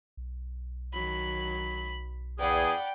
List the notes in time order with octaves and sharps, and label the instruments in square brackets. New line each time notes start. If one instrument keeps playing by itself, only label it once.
[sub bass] B1
[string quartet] D#3 F#3 [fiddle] B5
[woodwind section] E2 G#4 [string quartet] D5 F#5 B5 [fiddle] G5